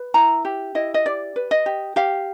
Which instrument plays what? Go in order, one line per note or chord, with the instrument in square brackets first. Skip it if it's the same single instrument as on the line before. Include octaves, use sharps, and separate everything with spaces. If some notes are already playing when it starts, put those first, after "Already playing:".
Already playing: [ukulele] B4
E4 A#5
G4
E4 D#5
D#5
G4 D5
B4
D#5
G4
G4 F5